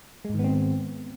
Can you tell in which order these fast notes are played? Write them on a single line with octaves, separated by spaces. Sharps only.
G#3 G#2 D#3 B3 C4